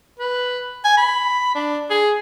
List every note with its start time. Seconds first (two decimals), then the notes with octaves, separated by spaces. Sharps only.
0.19 B4
0.85 G#5
0.97 B5
1.55 D4
1.90 G#4